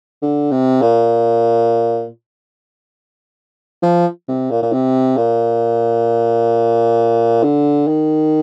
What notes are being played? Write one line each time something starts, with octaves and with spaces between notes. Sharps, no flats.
D3
C3
A#2
F3
C3
A#2
A#2
C3
A#2
D3
D#3